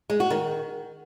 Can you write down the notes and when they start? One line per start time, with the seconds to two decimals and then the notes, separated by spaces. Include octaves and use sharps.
0.10 G#3
0.20 F#4
0.30 D#3